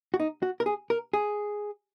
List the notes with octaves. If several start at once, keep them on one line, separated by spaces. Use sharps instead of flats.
F#4
D#4
F#4
A#4
G#4
A#4
G#4